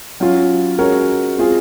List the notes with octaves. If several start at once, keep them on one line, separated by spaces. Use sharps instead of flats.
F#3 C#4 F4
G#3 C#4 F#4 A#4 C#5
G#3 C4 F4 G#4